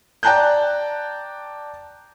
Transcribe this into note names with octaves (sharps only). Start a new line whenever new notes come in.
D5 G5 A5 A#5 F#6 G6